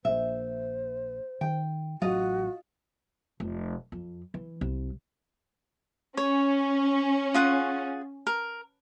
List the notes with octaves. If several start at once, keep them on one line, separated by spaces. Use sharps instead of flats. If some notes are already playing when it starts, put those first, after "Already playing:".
A#1 A#2 C5 E5
D#3 G5
A1 F#3 F4 F#4 D#5
F1
F2
E3
C2
C#4 C#5
F4 G#4 F#5
A#4